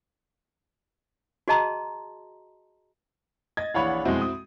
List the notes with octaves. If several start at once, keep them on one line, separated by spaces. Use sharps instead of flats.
F#4 G#4 D#5 A5 A#5 C6
D#5 G#6 A6
A#1 E3 C#5 F5 F#5 B5
F2 B2 G#3 C4 E4 F#4
D#6